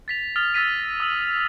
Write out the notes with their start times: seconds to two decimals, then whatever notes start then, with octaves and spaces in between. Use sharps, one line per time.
0.08 A6 B6 F7
0.36 D#6 F6 A6 F7
0.54 D#6 E6 A6 B6 D#7
0.80 A#6
1.00 D#6 E6 F#7